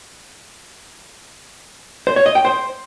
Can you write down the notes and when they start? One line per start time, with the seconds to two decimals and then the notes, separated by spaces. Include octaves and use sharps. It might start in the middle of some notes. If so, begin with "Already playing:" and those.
2.07 C5
2.16 C#5
2.26 D#5
2.35 G5
2.45 C5